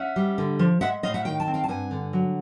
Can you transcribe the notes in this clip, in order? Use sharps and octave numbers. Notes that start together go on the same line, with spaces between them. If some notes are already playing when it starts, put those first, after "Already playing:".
Already playing: C#4 E5 F#5
G3
D3
F3
G#3 E5 F#5
A2 D#5 F5
E5 F#5
D#3 F5 G5
G5 A5
C4
F5 G5
A5
G2 F#5 G#5
D3
F#3